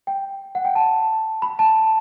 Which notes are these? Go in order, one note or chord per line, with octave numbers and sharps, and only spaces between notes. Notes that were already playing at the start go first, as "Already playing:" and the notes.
G5
F#5
G5
A5
B5
A5